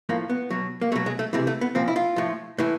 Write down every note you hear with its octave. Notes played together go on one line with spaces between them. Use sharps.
A2 F3 A#3
B3
B2 F#3
A#3
B2 F#3 A3
G#3
A3
C3 E3 G#3
A3
B3
A#2 F3 C4
E4
F4
A2 F3
A2 E3